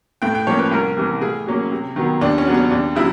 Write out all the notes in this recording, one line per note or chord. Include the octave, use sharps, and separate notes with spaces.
A2 G5
G5
F3 A#3 C#4 C#5
B4
C2 A#4
C3 E3
A2 G#4
F#3 A#3 C#4
C3
D#3 F#3 B3
D#2 D4
C#4
C#3 F#3 B3
C#4
D#2 D4
C#3 F#3 E4